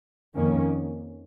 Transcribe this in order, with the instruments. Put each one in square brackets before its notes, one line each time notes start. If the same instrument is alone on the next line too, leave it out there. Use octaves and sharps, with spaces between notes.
[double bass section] F2 D#3 A#3 C#4